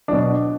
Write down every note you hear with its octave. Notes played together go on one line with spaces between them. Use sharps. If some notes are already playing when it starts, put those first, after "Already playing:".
B2 F#3 D4